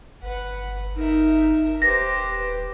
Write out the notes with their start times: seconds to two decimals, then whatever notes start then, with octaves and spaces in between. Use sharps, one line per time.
0.23 G1 B4 F#5
0.96 D#4 A#4 E5
1.82 D#1 G4 B4 C5 A#6